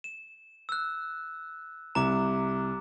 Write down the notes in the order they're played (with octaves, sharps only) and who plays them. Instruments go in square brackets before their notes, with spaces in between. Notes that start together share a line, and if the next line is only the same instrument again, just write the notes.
[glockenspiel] E7
E6 F#6
[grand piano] C2 [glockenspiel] A#5 D6